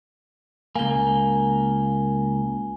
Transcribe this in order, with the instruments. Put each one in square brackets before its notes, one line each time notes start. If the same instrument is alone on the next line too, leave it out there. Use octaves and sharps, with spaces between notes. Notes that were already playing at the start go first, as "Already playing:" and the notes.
[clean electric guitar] C#2 A#3 [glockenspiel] G#5 G7